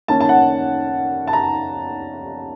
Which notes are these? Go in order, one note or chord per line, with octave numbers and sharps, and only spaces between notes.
D#3 A#3 C#4 A5
A5
F#5
A5
A#5